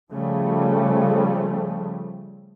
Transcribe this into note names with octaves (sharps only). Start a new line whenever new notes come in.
C#3 F3 G3 A3